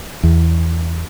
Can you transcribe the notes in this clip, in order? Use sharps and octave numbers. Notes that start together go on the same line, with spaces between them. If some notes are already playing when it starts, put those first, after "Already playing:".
E2